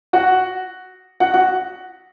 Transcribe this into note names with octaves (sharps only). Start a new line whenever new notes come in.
F#4 F#5
F#4 F#5
F#4 F#5